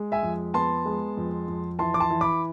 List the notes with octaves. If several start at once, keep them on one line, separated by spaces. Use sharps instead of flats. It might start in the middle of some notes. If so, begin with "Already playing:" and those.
Already playing: G#3
E5 G#5
F2
B3 A5 C6
G#3
F2
F2
E3 A5 C6
D6
A5 C6
E3
B5 D6